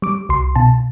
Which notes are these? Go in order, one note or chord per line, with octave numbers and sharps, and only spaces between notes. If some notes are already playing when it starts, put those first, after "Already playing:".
G3 D6
C2 C6
B2 A5